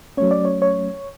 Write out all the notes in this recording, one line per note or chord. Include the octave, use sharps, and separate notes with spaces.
F#3 A3 C#4 C#5
D5
C#5
C#5